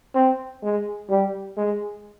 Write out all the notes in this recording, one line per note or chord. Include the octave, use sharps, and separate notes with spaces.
C4
G#3
G3
G#3